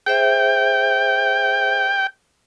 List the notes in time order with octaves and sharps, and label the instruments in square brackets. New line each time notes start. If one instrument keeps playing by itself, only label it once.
[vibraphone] G#4 C5 E5 [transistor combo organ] G5